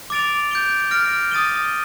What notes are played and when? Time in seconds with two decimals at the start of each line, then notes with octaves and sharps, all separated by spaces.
0.10 D6 A6 D7 F7
0.51 G6 D7 G7
0.91 F6 A#6 D7
1.31 D#6 A6 D#7 G7